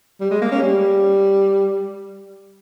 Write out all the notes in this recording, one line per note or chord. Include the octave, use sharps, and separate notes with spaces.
G3
G#3
A#3
C#4
G3